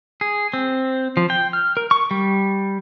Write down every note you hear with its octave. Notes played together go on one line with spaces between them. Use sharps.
G#4
C4
F3
G5
F6
A#4
C#6
G3